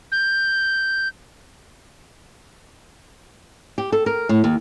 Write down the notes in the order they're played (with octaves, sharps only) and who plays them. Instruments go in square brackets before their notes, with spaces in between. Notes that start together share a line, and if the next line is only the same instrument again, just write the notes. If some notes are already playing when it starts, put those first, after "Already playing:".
[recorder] G6
[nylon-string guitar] G4
A4
A#4
A2
D#2